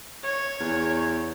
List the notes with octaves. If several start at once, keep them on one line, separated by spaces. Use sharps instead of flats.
C#5
E2